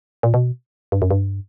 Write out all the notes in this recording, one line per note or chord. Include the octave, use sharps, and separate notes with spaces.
A#2
B2
G2
F#2
G2